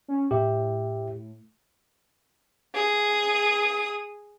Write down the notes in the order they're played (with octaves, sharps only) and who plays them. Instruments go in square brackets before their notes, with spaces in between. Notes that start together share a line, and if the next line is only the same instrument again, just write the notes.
[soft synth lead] C#4
[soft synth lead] A2 [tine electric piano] G4 E5
[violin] G#4 D#6